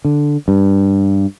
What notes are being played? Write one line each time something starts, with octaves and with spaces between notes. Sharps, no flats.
D3
G2